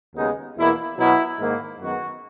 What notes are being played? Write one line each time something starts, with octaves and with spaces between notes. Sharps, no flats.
D#2 C#3 G#3 B3 D#4
E2 B2 A#3 E4
B2 F#3 B3 E4
G#2 D#3 A#3
F#2 D#3 G#3 B3 F#4